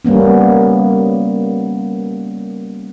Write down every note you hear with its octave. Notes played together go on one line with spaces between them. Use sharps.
G3 A#3 B3 C#4